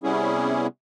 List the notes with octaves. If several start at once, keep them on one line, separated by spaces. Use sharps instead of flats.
C3 G3 B3 C#4 E4 G#4